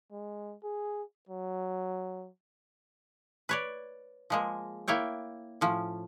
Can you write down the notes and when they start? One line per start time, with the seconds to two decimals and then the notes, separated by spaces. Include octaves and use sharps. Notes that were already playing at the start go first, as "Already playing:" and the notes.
0.12 G#3
0.63 G#4
1.29 F#3
3.49 B4 C#5 D5
4.30 F3 G#3 A#3
4.88 A#3 E4 C#5 G5
5.61 A2 F3 C#4